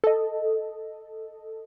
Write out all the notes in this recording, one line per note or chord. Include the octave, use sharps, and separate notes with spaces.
A4 D#5